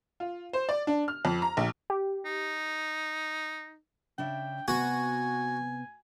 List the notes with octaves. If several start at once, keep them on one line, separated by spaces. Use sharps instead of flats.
F4
C5
D5
D4
F6
F2
A#5
A#1
G4
D#4
C#3 D4 E5 G5
C3 B3 F#4 G#5